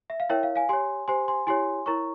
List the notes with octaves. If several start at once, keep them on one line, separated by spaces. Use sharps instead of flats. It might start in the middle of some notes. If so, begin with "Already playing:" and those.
E5
F5
E4 A#4 C#5 E5 G5
F5
F5 G#5
G4 C#5 G#5 C6
G4 C5 G#5 C6
G#5 C6
E4 G4 C#5 G#5 C6
E4 A#4 C#5 A#5 C#6